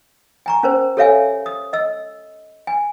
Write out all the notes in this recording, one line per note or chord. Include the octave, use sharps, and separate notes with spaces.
G#5 A#5 C#6
C#4 A#4 C5
G4 A4 C#5 E5 F5 G#5
D#6
D#5 E6
G#5